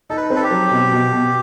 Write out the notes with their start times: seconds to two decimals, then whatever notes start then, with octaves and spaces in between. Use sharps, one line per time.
0.10 D#4 A4
0.17 B4
0.30 C4
0.36 A4
0.44 G4
0.50 F#3
0.71 B2
0.92 B2
1.12 B2